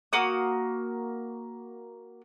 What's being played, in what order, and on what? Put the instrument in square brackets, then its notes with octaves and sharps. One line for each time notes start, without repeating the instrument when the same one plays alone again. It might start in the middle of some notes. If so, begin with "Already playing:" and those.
[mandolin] A#3 F#4 D#6